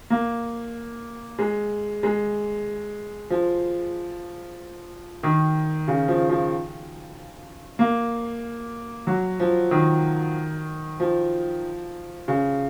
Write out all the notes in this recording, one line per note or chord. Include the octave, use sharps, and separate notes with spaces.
A#3
G#3
G#3
F3
D#3
C#3
F3
F3
A#3
F#3
F3
D#3
F3
C#3